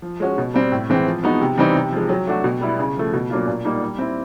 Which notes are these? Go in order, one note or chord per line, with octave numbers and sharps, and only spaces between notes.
F3
G#3 C#4 F#4
B2
G3 C4
A2
E3 G#3 C4
F3
G#3 B3 D#4 F#4
C3
E3 G3 C4 D#4
C3
F3 G#3
F#3
A3 D4 F#4
B2
G3 B3 E4
C#3
F3 A3
B2
F#3 A#3 D4 F4
A#2
G3 A#3 D#4
G3
C4 E4